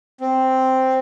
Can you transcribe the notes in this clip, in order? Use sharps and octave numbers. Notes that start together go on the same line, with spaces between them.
C4